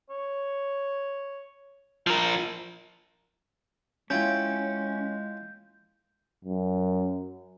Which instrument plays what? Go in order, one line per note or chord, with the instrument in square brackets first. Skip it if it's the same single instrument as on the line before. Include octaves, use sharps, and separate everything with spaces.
[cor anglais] C#5
[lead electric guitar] F3 A#4 [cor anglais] F5
[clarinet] G#3 [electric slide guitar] C#4 [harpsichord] E4 F4 G5 [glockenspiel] G6
[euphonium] F#2